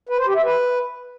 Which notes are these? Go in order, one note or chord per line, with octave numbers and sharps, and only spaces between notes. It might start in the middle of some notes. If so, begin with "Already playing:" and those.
B4
C5
G4
E5
B4